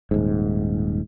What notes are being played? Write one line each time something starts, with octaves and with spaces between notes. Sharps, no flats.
D#1 G#2